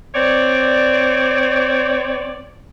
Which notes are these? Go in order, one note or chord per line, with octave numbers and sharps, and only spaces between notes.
C4 C#5 D5